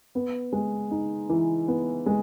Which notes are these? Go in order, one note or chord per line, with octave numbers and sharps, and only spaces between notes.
B3
G#3
D#4
E3
B3
G#3